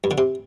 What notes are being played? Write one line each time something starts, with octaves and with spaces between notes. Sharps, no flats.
G2
D3
C3